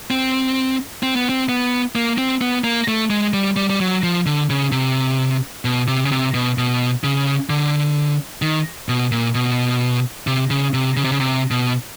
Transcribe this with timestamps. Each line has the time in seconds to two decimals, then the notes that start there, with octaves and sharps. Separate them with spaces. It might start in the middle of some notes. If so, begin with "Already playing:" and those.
0.10 C4
1.03 C4
1.16 B3
1.29 C4
1.49 B3
1.95 A#3
2.18 C4
2.41 B3
2.64 A#3
2.88 A3
3.10 G#3
3.33 G3
3.56 G3
3.70 G3
3.80 F#3
4.03 F3
4.26 D3
4.50 C#3
4.72 C3
5.65 B2
5.88 C3
6.05 C#3
6.11 C3
6.34 B2
6.58 B2
7.04 C#3
7.50 D3
8.42 D#3
8.89 B2
9.12 A#2
9.35 B2
10.27 C3
10.50 C#3
10.74 C3
10.97 C#3
11.04 C3
11.12 C#3
11.20 C3
11.51 B2